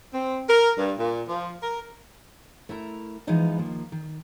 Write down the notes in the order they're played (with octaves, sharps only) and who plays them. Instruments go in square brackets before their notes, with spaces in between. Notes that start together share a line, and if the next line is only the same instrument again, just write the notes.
[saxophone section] C4
A#4
G2
A#2
F3
A#4
[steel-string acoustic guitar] A3 E4 A#4 A#5
E3 F3 G#3 B3 D#4 F4
D#3 F3 A#3
D#3